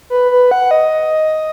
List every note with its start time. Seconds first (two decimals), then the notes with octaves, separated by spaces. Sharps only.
0.10 B4
0.31 B4
0.51 F#5
0.71 D#5